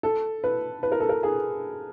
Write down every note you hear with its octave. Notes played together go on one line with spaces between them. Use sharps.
A4
B4
B4
A#4
A4
A#4
G#4